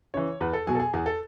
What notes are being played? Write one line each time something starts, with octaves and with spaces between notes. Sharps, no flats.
C#3 E3 C#5
E2 B4
A4
B2 F#3 G#4
A4
G#4
E2 G#4
A4